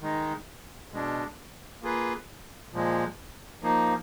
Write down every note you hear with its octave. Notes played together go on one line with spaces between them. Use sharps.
D#3 G#3 D#4
B2 G#3 D4
A#3 F4 G#4 B4
A#2 F3 G#3
F3 A#3 D#4